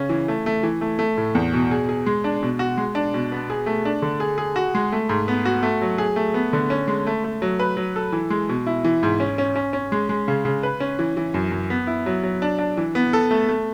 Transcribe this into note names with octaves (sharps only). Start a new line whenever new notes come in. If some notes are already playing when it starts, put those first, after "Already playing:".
Already playing: C#3 C#4
E3
A3
A3
E3
A3
A3
A2
E2
B2
G#4
G#4
G#3
D4
B2
F#4
G#3
D4
B2
B3
G#4
A3
D4
D3
G#4
G#4
F#4
G#3
A3
G#2
B3
F#4
A3
F#3
G#4
A3
B3
D3
C#4
G#3
A3
A3
F#3
B4
F#3
A4
E3
G#3
B2
E4
E3
G#2
C#4
C#4
C#4
C#4
G#3
G#3
C#3
C#3
B4
C#4
E3
E3
F#2
F#2
B3
E4
F#3
F#3
D4
D4
E3
B3
A4
A3
A3